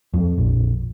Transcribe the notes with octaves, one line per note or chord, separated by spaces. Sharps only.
F2
A#1